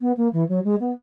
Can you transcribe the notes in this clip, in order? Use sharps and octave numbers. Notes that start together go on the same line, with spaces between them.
B3
A#3
E3
F#3
G#3
B3